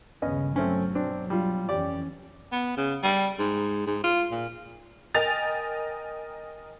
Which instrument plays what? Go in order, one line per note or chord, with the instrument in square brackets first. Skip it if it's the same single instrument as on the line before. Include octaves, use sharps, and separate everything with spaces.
[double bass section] G1 D#2 C#3 [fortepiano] B3 C#4 D#5
[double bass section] B2 F#3 [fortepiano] A3 C4 C#4
[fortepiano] C4 D4
G3 F4
[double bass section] F2 E3 C#4 [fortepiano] G4 D5
[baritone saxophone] B3
C#3
G3
G#2
G#2
F4
A#2
[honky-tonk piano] A#4 D#5 G5 G#5 A6 F7